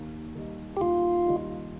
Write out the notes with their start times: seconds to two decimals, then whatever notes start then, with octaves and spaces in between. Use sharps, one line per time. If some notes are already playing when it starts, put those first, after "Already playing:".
Already playing: D#2
0.35 D#3 G3 D#4
0.77 G4
0.81 D#2 F4
1.26 D#3 G3 D#4